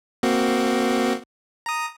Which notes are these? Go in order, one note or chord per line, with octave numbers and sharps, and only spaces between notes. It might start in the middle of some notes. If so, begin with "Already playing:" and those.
A#3 C4 F#4
A#5 D#6